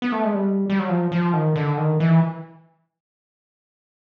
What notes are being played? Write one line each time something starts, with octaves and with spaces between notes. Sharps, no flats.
B3
A3
G#3
G3
G3
F#3
F3
F3
D#3
D3
D#3
E3